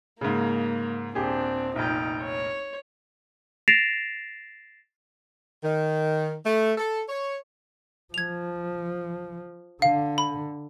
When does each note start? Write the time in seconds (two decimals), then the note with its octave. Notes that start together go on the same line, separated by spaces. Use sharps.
0.21 G#2 C#3 A#3
1.15 D#1 C4 D4 G4 G#4
1.76 F1 A#1 D#4 G5
2.23 C#5
3.68 A6 A#6 C7 D7 E7 F7
5.64 D#3
6.45 A3
6.78 A4
7.09 C#5
8.14 F3 G#6 F7
9.82 D3 F5
10.18 B5